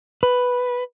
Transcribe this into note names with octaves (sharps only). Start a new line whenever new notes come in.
B4